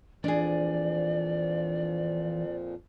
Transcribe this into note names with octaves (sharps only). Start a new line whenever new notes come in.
F2 A#2 E3 F3 D4 G#4 D5